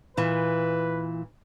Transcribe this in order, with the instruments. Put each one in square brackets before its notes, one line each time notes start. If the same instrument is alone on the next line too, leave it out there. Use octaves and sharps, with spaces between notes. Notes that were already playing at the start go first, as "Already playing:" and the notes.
[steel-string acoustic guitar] A#2 E3 [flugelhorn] B4